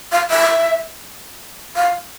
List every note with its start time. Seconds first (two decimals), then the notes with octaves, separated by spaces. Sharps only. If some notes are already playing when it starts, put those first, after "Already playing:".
0.12 F5
0.30 E5
1.76 F5